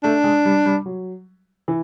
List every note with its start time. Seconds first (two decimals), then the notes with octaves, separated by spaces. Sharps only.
0.03 A3 D4
0.24 G#3
0.45 G3
0.66 G3
0.86 F#3
1.68 E3